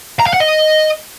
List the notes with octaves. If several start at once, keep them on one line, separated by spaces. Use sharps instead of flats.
A#5
F5
F#5
D#5